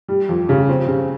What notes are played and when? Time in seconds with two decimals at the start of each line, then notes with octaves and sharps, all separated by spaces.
0.08 G3
0.29 F2
0.49 C#3
0.69 C4
0.88 C#3